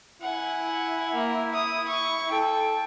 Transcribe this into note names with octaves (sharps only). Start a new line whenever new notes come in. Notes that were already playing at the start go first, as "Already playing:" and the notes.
E4 F#5 G#5
A#3
D#6
C#6
A4 G5